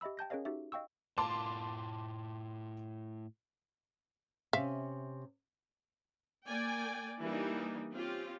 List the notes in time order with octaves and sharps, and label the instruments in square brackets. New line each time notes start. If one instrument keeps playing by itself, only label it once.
[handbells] G4 D#5 E5 B5 E6
G5 A5 G6 A#6
C#4 G#4 A#4 C#5 D#5 F5
D#4 F#4 G4 E5
D#5 F5 G5 C#6 E6
[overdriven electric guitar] A2 F4 [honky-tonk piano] A5 C6 D6
[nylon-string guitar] C3 C#4 [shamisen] E5 F5
[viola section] A#3 D5 G5 G#5
E3 G3 A#3 D4 D#4
C4 C#4 F4 G4